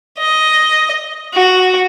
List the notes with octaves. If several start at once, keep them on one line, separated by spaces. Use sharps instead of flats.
D#5
F#4